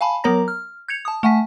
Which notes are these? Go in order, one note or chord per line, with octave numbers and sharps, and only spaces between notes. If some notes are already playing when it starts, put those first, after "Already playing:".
F5 G#5 A5 B5
F#3 B3 A#4 C#5 A#5 A#6
F6
G6 G#6 C#7 F7
A5 D#6
A3 F#5 G#5 A5 B6